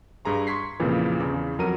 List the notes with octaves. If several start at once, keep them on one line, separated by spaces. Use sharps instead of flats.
G2 G#4 A#5 C6
C6 C#6 G#6 B6 C7
F2 A#2 C#3 E3
E2 C#3
F2 F#3 A#4 A#5 D#7